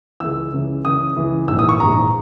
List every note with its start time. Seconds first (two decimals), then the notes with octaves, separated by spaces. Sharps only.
0.20 C#2 C#3 E3 E6
0.52 C#2 C#3 E3
0.85 C#2 C#3 E3 D#6
1.16 C#2 C#3 E3
1.48 A#1 G#2 E3 E6
1.59 D#6
1.69 C#6
1.80 A#1 G#2 E3 A#5